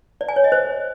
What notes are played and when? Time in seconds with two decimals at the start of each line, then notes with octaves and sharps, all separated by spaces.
0.21 D5
0.29 G#5
0.36 C#5
0.44 D#5
0.52 C5